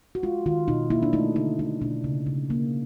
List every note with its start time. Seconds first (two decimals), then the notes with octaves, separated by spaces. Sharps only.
0.15 F#4
0.23 G#3 F4
0.46 D#3 F4
0.68 B2 D#4
0.90 A#3 E4
1.03 D4
1.13 A3 D#4
1.36 D3 D#4
1.59 G#3 D#4
1.82 B2 D4
2.04 C#3
2.27 C#3
2.50 A#3